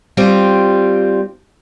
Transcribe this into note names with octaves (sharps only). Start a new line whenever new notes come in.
G3 C4 F4